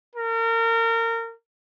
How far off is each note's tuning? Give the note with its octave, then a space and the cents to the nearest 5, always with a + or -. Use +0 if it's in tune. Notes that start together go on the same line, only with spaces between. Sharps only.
A#4 -30